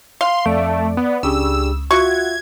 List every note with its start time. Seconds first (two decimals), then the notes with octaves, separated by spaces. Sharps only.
0.21 F5 C6
0.46 F2 A3 D5
0.97 B3
1.23 C#2 D4 G4 G#4 E6
1.91 F4 F#4 E5 C#6 G#6